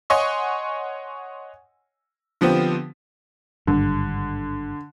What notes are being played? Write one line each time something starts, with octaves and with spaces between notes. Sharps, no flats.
C#5 D#5 F#5 G#5 C6 C#6
D3 F3 B3 C4 G4
G#1 G2 D3